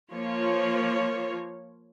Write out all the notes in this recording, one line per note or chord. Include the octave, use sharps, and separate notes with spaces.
F3 A#3 F4 C#5